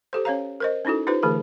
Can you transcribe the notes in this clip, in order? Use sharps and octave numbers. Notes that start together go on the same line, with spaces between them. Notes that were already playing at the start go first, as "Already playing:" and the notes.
G4 A4 C5
C#4 C#5 F5 A#5
A#4 C5 D#5
C#4 D#4 E4 F#4 A4
D#4 F4 G4 B4 C5
D3 E3 A3 G#4 A#4